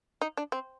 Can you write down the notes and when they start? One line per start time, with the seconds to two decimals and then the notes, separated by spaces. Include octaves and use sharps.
0.21 D#4
0.37 D4
0.52 C4